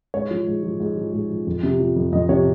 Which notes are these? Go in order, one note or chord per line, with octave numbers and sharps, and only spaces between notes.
G#2 C#5
F3
G#2
F3
G#2
F3
G#2
F3
F2
C3
F3
F2
F2 D#5
C3 C#5